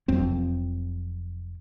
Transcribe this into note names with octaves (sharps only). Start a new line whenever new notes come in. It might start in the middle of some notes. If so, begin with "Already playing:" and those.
F1 F2 F#3 C4